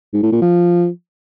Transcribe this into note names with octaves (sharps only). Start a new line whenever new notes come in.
G#2
A2
A#2
F3